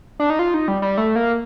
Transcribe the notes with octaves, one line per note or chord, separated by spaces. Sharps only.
D4
D#4
F4
D#4
G3
G3
A3
A#3